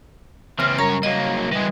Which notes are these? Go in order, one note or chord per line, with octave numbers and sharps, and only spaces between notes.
C#3 E3 C4 F6 A#6
F#2 G3 A#4 C#5 A#5
F#3 A#3 D#5
E3 G3 G#3